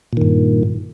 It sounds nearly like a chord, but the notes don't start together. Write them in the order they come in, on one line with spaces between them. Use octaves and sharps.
A#2 D#3 G2